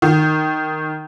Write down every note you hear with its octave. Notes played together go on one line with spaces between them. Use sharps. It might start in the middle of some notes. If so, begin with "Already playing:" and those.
D#3